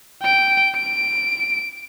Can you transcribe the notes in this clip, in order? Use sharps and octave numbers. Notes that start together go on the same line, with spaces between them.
G5 D7
D7